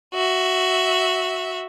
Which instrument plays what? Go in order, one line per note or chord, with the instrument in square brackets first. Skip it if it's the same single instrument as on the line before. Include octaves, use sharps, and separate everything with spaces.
[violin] F#4 E5